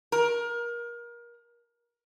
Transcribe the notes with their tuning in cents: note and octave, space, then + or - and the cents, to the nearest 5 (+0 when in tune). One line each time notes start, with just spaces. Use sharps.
A#4 +25